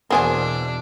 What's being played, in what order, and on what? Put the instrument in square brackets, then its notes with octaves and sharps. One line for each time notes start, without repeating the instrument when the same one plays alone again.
[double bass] E2 B2 [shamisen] A#3 G#4 [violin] D4 [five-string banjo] F#4 C5 G#5